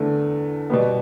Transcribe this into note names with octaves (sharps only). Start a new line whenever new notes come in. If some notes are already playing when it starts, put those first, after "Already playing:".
Already playing: E2 D3 A3
B2 G3 B3